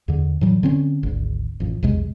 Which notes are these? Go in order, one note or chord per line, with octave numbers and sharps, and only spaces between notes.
E2 D3
A2 E3 F#3 G3
D3 C4 C#4
G#1 D2
A1 F2
A#1 E2 C3 G#3